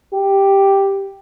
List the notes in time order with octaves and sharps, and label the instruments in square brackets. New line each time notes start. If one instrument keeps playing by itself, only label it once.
[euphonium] G4